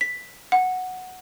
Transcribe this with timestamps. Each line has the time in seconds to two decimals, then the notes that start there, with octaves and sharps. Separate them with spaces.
0.01 B6
0.52 F#5